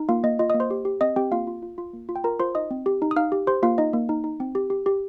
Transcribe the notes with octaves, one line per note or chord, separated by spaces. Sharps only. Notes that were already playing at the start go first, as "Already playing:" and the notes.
Already playing: D#4
A#3 F4 F5
A#3 D#5
F4 D#5
D#5 D#6
A#3
C5 C6
G4
G4
C4 D#5 D#6
C4 G4 G5
A#3 F4 F5
F4
F4
F4
A#3
F4
G5
F4 A#4 A#5
F4 C5 C6
D#4 D#5 D#6
C4
G4
D#4
D#6
D#4 F5 F6
G4
G4 C5 C6
A#3 F4 F5
D#4 D#5
A#3
D#4
D#4
C4
G4
G4
G4